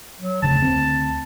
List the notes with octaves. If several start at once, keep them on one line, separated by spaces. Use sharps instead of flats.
F#3
F1 D2 C#3 A5
D2 C4